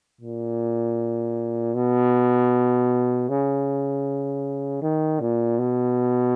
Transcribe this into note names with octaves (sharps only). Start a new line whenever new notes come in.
A#2
B2
C#3
D#3
A#2
B2